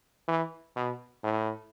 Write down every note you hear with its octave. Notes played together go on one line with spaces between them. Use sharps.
E3
B2
A2